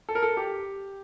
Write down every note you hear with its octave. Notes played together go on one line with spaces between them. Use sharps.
A4
A#4
A4
G4